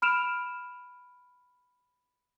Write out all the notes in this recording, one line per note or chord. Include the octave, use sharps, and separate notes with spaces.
B5 F6 D7 E7 F7